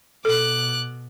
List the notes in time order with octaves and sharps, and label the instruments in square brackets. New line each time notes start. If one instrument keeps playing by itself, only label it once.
[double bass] B2 [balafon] A4 [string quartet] D6 F#6